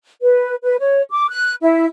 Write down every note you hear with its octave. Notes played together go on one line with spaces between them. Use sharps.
B4
B4
C#5
D6
F#6
E4